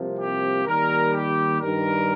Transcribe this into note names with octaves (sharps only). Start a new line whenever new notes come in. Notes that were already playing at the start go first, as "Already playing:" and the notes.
Already playing: C2 C3 F3 A#3
G4
D#2 D#3 G3 A#4
G4
G2 D#3 G3 A#4